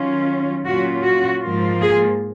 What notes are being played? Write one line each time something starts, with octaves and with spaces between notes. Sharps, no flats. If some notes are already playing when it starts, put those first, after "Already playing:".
Already playing: D#3 F#3 C#4 F4
A#2 F#3 C#4 F4 F#4
F#4
G#2 F3 A#3 F4
G#4